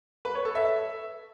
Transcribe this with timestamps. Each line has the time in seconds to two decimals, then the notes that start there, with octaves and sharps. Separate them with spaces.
0.25 B4
0.35 C#5
0.45 A4
0.55 E5